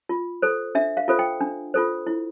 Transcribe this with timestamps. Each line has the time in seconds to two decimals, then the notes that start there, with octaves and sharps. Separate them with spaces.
0.09 F4
0.42 A4 C5
0.75 D4 E5
0.97 F5
1.08 F4 A4 C5
1.19 G5
1.41 D4
1.74 F4 A4 C5
2.07 E4